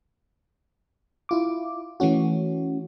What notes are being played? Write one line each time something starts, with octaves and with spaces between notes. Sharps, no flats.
E4 F4 D6
E3 A3 C#4 F#4